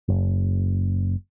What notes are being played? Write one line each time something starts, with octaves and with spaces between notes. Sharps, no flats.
F#1